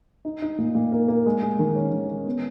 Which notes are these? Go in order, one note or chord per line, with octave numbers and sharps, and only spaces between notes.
D#4
D#4
A#2
A#2
A#3
A#3
G#3
G#3
D#3
C#4
D#3
C#4
B3